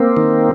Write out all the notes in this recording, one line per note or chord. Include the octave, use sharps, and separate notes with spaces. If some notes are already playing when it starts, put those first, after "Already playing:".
Already playing: A#3 C4
D#3